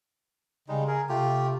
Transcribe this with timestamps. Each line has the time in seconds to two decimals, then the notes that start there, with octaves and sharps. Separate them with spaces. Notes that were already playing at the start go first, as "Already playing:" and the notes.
0.68 C#3 G3 G#3 D#4
0.87 G#4 A#4
1.09 C3 A3 F4 G4